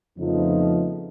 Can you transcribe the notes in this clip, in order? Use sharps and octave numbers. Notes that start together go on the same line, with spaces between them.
F2 C#3 F3 A3 B3 D#4